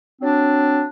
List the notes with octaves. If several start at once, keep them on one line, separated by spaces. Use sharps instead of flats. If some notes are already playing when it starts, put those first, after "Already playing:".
F#3 C4 D4